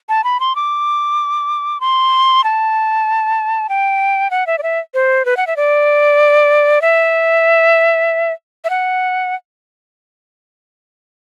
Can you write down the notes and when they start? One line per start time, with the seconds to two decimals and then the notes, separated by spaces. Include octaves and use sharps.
0.09 A5
0.24 B5
0.40 C6
0.56 D6
1.81 C6
2.44 A5
3.69 G5
4.31 F#5
4.47 E5
4.58 D5
4.63 E5
4.94 C5
5.25 B4
5.37 F#5
5.47 E5
5.56 D5
6.82 E5
8.64 E5
8.70 F#5